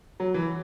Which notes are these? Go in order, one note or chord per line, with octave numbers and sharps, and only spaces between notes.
F#3
E3